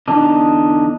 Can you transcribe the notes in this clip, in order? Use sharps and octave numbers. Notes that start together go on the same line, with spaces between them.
E2 D3 D4 D#4